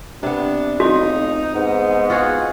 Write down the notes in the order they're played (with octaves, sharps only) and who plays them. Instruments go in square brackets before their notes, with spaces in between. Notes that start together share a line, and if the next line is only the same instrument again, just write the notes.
[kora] C3 B3 [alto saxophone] D4
[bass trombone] F1 [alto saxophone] D#4 [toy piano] F#4
[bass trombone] G#2 [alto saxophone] B3
[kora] F4 F#4 G#4